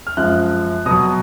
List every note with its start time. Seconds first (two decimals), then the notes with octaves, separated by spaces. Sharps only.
0.07 F6
0.17 F#2 F3 G#3 F#6
0.86 B2 F#3 D#6